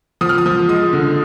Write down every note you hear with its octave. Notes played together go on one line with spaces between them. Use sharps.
F3 D#6
F6
D#6
F3
G#3 D#6
D3